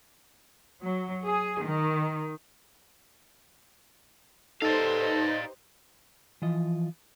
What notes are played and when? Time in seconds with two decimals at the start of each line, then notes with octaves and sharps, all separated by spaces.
0.83 F#3
1.25 G#4
1.63 D#3
4.62 D#4 G4 A4 B4 C5 D5 F5
6.42 E3 F3 F4 D#5